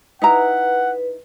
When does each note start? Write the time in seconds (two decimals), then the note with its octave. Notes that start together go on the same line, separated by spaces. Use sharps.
0.22 D#4 E4 B4 F#5 A#5